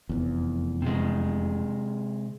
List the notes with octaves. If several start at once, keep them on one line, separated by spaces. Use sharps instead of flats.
F1 E2
C3 G#3